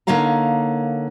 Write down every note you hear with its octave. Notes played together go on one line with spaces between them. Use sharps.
D3 A#3 D#4 C#5 F5 A#5